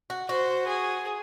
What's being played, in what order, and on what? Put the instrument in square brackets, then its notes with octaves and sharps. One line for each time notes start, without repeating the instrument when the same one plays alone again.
[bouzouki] F#4
[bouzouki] F#4 [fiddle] C5
[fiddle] G#4